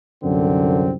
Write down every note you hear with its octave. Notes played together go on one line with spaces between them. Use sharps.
C2 F#2 D3 C4